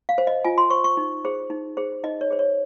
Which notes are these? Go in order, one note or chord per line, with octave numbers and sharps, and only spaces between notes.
F5
C5
D#5
F4 G#5
C6
C5 C#6
C#6
D#4
G#4 C5
D#4
G#4 C5
D#4 D#5
C#5
G#4 C5
C#5